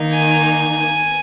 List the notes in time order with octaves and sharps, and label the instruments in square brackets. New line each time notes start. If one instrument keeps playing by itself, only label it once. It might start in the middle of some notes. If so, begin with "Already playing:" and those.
Already playing: [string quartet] D#3 A#3 D#4
[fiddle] G#5